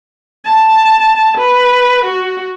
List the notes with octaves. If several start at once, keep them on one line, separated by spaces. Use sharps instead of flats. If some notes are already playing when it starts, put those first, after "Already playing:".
A5
B4
F#4